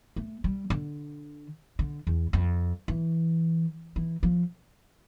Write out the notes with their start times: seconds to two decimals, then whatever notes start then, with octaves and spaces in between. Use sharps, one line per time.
0.16 A3
0.44 G3
0.70 D3
1.79 D3
2.07 E2
2.33 F2
2.88 E3
3.96 E3
4.23 F3